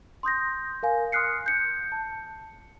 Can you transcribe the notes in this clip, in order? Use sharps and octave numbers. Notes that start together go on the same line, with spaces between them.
C6 D#6 G6 A#6
A#4 F5 G#5
C6 D#6 F6 F#6 C7 C#7
G6 C#7
A5